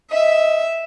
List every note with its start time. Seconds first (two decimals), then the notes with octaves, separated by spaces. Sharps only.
0.12 D#5 E5